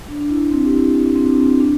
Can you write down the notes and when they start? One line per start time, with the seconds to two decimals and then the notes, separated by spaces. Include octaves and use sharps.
0.08 D4
0.20 D4
0.29 E4
0.51 C4
0.65 G4
0.73 E4
1.16 C4
1.26 D4
1.36 C4
1.60 D4